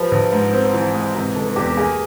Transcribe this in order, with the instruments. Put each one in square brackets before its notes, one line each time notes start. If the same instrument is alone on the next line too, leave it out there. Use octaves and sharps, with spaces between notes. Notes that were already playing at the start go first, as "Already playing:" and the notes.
Already playing: [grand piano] F3 [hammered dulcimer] G4 B4
[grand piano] A#1
G#2
C4
E3
G#3
[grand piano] C3 [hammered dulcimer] A#4
[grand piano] F1 [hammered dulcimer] A4
[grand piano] E2 [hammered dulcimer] G4
[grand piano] A#3 [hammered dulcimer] G#4